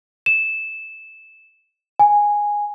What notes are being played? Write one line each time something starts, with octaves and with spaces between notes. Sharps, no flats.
E7
G#5